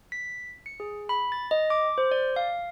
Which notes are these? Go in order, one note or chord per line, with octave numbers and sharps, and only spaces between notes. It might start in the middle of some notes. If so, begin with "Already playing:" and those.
B6
C#7
G#4
B5
A6
D#5
D6
C5
D5
F5